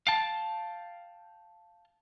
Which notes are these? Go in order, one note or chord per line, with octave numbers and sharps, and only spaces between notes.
F5 G5 A5